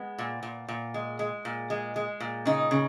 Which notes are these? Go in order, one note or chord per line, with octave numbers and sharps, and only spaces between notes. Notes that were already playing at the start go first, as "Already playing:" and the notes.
Already playing: G#3 B3
A#2
A#2
A#2
G#3
G#3
A#2
G#3
G#3
A#2
C#3 D#4
C#3